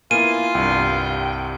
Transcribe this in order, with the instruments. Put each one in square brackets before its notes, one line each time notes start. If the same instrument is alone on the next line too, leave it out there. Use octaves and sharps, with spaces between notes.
[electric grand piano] A#3 B3 E4 [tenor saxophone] F4 [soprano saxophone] G#5 [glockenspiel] D#7
[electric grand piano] C2 G2 [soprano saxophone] G5